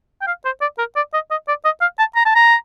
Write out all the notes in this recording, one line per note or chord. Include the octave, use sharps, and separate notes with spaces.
G5
F5
C5
D5
A#4
D5
D#5
D#5
D5
D#5
F5
A5
A#5
A5
A#5